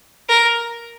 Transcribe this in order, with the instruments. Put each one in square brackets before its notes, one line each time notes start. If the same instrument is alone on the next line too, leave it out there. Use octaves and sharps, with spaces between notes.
[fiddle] A#4